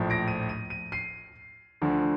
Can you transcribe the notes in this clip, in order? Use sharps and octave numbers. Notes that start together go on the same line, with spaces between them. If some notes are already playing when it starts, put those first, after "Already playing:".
Already playing: A#1 A2 F3
A#6 D7
D#7
D#7
D#7
C7 D#7
D2 D3 F3